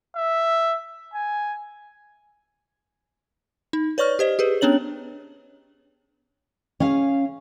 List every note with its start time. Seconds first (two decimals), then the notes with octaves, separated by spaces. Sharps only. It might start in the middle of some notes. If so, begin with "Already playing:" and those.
0.16 E5
1.14 G#5
3.73 D#4
3.98 B4 C#5 D5 C#6 F6
4.19 G4 C5 D#5
4.39 G4 G#4 B4
4.61 B3 C#4 D4 C#5 F#7
6.80 C#4 G#4 F5